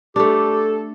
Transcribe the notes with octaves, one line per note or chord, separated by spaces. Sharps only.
A3 D4 G4 A4